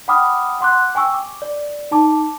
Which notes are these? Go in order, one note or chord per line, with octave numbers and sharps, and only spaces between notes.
F#5 G5 B5 D6 D#6 F6
F#5 C6 D6 F#6
G5 G#5 C#6 E6
D6
D5
D#4 A5 D6